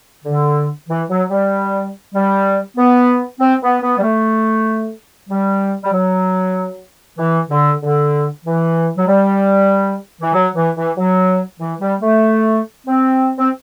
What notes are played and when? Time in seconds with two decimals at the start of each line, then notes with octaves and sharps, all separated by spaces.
0.25 D3
0.89 E3
1.09 F#3
1.30 G3
2.15 G3
2.77 B3
3.40 C4
3.62 B3
3.82 B3
3.98 G3
4.03 A3
5.29 G3
5.83 G3
5.93 F#3
7.18 E3
7.51 D3
7.82 D3
8.45 E3
8.97 F#3
9.07 G3
10.21 E3
10.34 F#3
10.56 E3
10.77 E3
10.97 F#3
11.60 E3
11.81 G3
12.01 A3
12.87 C4
13.38 C4